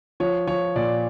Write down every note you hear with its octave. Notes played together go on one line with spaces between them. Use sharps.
F3 C#5
F3 C#5
A#2 D5